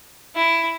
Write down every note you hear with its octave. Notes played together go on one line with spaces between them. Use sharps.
E4